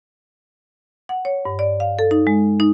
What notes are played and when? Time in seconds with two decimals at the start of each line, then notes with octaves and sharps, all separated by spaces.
1.09 F#5
1.25 C#5
1.45 G2
1.59 D5
1.80 F5
1.99 A4
2.11 D#4
2.27 G#3
2.60 D#4